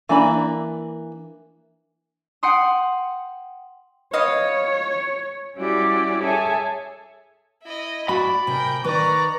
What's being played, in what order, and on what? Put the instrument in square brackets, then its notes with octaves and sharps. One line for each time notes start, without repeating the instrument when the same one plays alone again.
[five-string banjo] E3 A#3 D4 B5
[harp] F#5 G5 C6 D#6
[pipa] B3 D#5 F5 [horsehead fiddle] C#5
[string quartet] G3 C#4 E4 F#4 G4 D5
G#4 A4 C#5 E5 G#5
[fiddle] E4 D#5
[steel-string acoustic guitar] F#4 [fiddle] D5 [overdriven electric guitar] B5
[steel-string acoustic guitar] C3 G#5 [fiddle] A#4 G5
[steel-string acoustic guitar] D#3 B4 [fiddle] D5 A#5 [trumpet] C#6